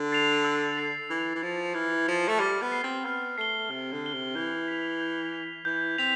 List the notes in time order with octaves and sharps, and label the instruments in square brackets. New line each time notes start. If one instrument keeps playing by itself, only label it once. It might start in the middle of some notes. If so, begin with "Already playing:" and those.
Already playing: [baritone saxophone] D3
[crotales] A6 C7 F7
E6
A6 C7 F7
[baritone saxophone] E3 [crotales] E6
[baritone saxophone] E3
[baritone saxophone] F3 [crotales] A6 C7 F7
[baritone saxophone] E3 [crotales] F6
[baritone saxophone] F3 [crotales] C7 G7
[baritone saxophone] A3
[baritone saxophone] G3 [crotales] F6
[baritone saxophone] B3
[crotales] C7 G7
[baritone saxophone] C4
[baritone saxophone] B3 [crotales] F6
[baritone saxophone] A3 [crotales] C7 G7
[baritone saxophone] C3 [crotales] F6
[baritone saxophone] D3
[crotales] C7 G7
[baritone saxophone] C3
[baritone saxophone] E3 [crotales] G6
[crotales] B6 F7
G6
B6 F7
[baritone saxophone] E3 [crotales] G6
[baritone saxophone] C4 [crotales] B6 F7